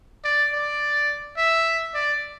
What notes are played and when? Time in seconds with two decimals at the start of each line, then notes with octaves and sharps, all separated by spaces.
0.24 D5
0.53 D5
1.37 E5
1.95 D5